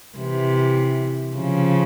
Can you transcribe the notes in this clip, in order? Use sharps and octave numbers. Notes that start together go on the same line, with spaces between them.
C3 E3
C#3 F3